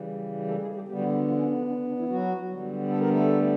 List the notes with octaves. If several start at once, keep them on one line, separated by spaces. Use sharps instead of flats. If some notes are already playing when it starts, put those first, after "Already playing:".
Already playing: C#3 E3 G3
A3 A4
G#3 G#4
G3 G4
D3 G3 B3 G4
F#3 F#4
G3 G4
F#3 F#4
F3 F4
C#4
D3 D4
D3 D4
D3 D4
D3 D4
E3 E4
F#3 F#4
D3 G3 B3
A4
A#4
A3 A4